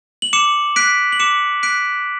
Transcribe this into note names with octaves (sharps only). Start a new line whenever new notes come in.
F#7
D6 C#7 E7
F#6 B6 D7
F#7
D6 C#7 E7
F#6 B6 D7